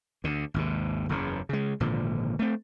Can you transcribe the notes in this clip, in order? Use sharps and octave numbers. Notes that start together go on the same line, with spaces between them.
D2 D3
G#1 D#2 C3
F#1 E2 C#3
C#3 G#3
G#1 A#2 D3 F3
A3 C4